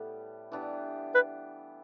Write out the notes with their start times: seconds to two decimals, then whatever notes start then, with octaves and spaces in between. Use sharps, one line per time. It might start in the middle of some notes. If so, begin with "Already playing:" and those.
Already playing: A2 G3 B3
0.52 E3 B3 D4 G4
1.14 B4